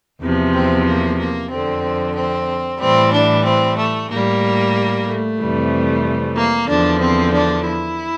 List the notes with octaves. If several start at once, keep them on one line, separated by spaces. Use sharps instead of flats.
E2 C3 F3
C4
A#3
A#3
F2 D3 F3 C4
C4
A2 E3 G3 C4
D4
C4
A3
A2 G3 A#3
A3
F2 C3 E3 G3
A#3
E2 D3 F3 D4
C4
D4
E4